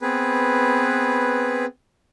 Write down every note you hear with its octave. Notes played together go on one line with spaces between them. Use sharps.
B3 C4 G#4 B4